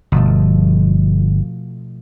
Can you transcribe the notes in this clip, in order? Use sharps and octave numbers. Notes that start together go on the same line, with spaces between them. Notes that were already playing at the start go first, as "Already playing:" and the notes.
G1 B2 F3 A3